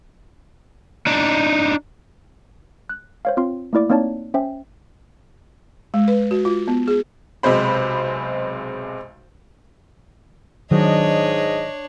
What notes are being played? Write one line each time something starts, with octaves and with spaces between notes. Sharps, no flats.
D4 D#4
F#6
C5 C#5 F5
C4 F4 C6
A3 A#3 E4 D5 D6
A#3 C4 D#4 C#5 D5 A5
C#4 C5 E5 G5
G#3
B4
F#4
F4
B3
G#4
B1 C3 G#3 C5 B5
G#2 D#3 F#3 D4 C#5 D#5